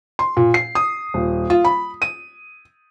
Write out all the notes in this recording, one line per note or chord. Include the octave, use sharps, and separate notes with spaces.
C6
A#2
C7
D#6
D#1
F4
B5
D#7